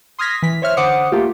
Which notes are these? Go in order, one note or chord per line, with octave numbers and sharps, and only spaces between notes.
C6 D#6 F6 G#6 A#6 B6
E3 B6
C5 C#5 E5 F6
D3 C5 F#5 D6 D#6 C#7
A3 A#3 F4 G4